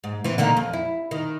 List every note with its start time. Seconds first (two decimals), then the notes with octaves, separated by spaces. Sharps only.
0.04 G#2
0.24 E3 C4
0.38 D3 D#3 A#3
0.57 F2
0.73 E4
1.11 D#3